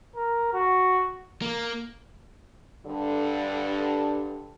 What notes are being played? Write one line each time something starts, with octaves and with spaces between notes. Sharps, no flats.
A#4
F#4
A#3
G2 D3